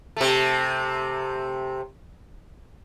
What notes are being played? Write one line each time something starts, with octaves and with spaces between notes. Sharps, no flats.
C3 A3